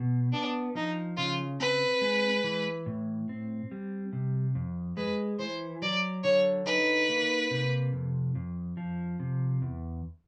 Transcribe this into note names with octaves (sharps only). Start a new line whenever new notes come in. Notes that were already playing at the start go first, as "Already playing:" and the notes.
Already playing: B2
B3 D4
F3 D#4
C#3 F4
C4 B4
G#3
E3
A2
C4
G3
C3
F2
G#3 B4
E3 C5
F#3 D5
D3 C#5
D#4 B4
A#3
C3
F2
F2
F3
C3
E2